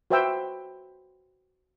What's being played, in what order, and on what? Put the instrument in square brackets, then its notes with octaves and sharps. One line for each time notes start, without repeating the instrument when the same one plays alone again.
[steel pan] F#4 B4 C5 E5 G5 E6